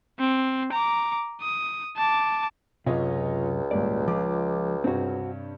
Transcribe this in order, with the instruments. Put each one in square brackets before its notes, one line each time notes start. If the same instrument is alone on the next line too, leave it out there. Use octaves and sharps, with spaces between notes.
[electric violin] C4
A#5 D6
D#6
A5 D6
[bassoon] C#2 [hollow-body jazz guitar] F#2 C3 [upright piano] F4 C#5 D#5
[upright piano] G#1 A#2 G3 [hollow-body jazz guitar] D5
[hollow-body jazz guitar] F3 G#3 [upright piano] D6
[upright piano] G2 C3 C#5 [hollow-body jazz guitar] C4 F#4